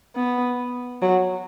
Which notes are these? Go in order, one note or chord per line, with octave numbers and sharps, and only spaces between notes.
B3
F#3